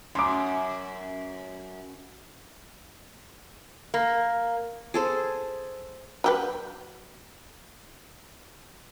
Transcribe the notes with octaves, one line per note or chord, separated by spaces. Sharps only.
F#2 C6 D6
A#3
G#4 A4 C5
F#3 G4 B4